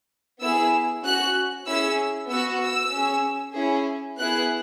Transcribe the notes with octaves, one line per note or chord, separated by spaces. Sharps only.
B3 E4 G#4 E6
C#4 F#4 F#6
C#4 E4 G#4 E6
B3 F#4 E6
E6
C#4 G#4
C#4 E4 G#4
B3 E4 G#4 F#6